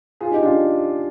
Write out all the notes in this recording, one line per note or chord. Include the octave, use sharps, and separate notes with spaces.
F4 G#4
D#4 G4
D4 F4